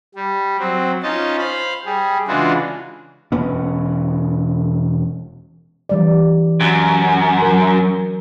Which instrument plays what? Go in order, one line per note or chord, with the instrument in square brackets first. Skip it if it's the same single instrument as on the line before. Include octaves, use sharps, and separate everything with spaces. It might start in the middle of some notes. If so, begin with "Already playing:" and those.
[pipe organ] G3
F#3 C4
C#4 D#4 F4 D#5 A5
C5 F5 B5
G3 G#4
C#3 E3 G#3 D4 F4 F#4
[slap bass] E1 B3 C#4
[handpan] E3 G3 D5
[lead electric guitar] F#2
[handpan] F#3 A#4